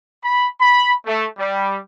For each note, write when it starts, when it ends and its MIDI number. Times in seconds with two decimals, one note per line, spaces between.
0.23 0.48 83
0.60 0.93 83
1.06 1.26 57
1.39 1.78 55